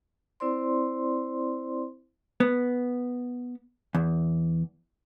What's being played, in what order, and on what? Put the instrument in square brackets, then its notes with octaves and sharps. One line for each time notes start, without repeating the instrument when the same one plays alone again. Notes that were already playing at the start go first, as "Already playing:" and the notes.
[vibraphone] C4 E4 C5 D5 C6
[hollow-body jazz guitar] B3
E2